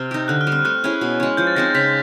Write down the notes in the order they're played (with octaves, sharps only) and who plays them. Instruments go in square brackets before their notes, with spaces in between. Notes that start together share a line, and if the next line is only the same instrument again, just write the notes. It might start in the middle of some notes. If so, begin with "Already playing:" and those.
Already playing: [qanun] C3 C4 [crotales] F6
[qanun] D#4 G4
[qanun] D3 [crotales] F#6
[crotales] F6
[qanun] G3
[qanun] C4 [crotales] F6
[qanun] A3 [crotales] F#6
[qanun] C#4 E4 G#4
B2
G#3 C#4
[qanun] F3 [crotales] G6
[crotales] A6
[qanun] G#3 C4 D#4 [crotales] A#6
[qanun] C#3 [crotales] B6